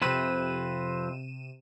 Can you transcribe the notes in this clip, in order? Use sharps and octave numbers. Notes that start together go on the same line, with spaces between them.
F2 C3 C4 B4 D#7 E7